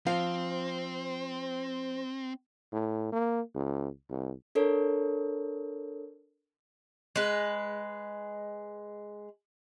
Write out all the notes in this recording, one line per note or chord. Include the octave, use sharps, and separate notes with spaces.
F3 C4 C5 F5
A2
A#3
C#2
C2
D4 A4 A#4 C#5
G#3 B4